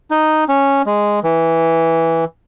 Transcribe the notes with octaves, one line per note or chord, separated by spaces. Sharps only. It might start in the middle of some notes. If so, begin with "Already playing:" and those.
D#4
C#4
G#3
E3